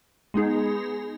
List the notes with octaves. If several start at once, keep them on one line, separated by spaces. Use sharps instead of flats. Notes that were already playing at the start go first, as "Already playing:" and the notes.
G#3 B3 D#4 G#4